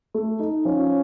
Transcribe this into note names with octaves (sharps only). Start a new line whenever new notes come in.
A3
D#4
F3 C#4